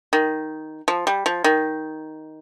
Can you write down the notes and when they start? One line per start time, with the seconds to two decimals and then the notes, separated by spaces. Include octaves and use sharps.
0.13 D#3
0.88 F3
1.07 G3
1.26 F3
1.44 D#3